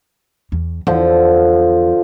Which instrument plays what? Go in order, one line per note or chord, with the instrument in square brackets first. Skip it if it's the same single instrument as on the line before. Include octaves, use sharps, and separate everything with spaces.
[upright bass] E2
[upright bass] E2 [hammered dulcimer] D3 F3